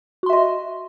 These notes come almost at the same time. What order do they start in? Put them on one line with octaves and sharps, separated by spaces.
F#4 C6 E5 D#5